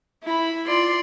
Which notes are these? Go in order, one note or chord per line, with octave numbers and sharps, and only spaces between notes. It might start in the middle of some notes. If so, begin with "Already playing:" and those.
E4 B5
F4 D5 C6